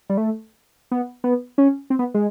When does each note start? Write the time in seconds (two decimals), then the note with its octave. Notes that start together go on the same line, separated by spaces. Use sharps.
0.09 G3
0.17 A3
0.91 B3
1.24 B3
1.58 C#4
1.90 C4
1.99 B3
2.14 G#3